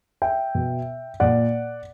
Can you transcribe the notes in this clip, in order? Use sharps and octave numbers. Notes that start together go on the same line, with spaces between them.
E5 G5
B2
A#2 D5 F#5